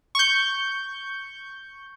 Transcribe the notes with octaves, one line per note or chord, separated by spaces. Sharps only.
C#6 G6